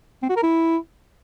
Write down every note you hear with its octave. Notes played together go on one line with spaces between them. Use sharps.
C4
F#4
A#4
E4